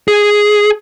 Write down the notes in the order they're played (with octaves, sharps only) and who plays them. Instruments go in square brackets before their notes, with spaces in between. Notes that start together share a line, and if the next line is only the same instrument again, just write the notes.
[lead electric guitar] G#4